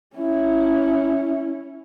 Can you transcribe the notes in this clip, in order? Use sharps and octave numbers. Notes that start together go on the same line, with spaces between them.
C#4 E4